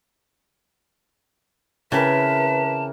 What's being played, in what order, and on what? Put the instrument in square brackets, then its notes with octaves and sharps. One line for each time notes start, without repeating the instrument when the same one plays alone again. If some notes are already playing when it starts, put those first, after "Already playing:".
[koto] C#3 [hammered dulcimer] E3 C4 A#4 [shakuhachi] B4 [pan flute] A5